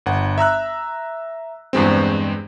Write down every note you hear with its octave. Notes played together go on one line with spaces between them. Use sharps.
G1 F#5
E5 A#5 E6 F#6
E2 G2 G#3 C4